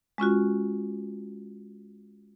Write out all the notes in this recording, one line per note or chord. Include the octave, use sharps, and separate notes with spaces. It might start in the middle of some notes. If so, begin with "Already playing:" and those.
G#3 C#4 F4 F#4